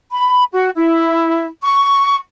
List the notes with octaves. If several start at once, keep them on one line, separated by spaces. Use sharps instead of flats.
B5
F#4
E4
C#6